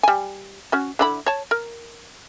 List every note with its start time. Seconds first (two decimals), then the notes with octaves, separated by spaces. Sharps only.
0.03 G3 G#5
0.72 C#4 F#4
0.99 D3 E4 B5
1.26 C#5 A5
1.51 A#4